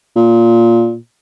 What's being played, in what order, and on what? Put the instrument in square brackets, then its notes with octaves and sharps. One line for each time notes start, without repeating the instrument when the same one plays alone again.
[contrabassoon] A#2